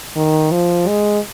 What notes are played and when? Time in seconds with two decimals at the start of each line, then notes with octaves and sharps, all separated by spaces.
0.16 D#3
0.51 F3
0.88 G#3